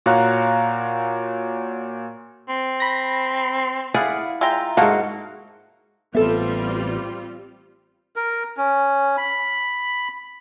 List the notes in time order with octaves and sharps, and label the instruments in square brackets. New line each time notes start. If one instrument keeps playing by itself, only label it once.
[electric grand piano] A#2 F#4 C#5 F5 A#5 F#6
[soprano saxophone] C4
[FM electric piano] B5 A#6
[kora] E4 D5 F#5 [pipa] G#4 [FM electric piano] F5 B5
[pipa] G#3 G5 [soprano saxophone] F4 [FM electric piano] E5 A#5
[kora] G#2 F#4 [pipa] A#3 A4 F5
[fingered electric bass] A1 B3 [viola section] G3 C4 F4 [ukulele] A4 E5
[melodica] A#4
C#4
B5